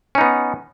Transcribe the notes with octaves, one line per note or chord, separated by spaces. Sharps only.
B3 C#4 D#4